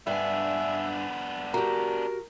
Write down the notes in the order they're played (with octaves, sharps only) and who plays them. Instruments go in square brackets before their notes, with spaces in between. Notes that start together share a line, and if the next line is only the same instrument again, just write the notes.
[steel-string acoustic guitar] G2 G#5 [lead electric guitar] B3 D4 [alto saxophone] E5
[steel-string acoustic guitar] F#4 G4 [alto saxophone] A#4 [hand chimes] A#5